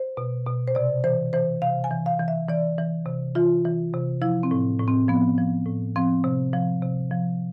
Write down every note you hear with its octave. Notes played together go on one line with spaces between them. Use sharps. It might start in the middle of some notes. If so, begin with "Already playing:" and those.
Already playing: C5
B2
B2
C5
C3 D5
E3 C5
E3 C5
C3 F5
G#5
E3
F5
E3
E5
E3 D5
E3
C3
E3 F4
E3
C3
F3 E4
C4
A2
A2
C4
F3 B3
F3
A2
F3 C4
C3
F3
C3
F3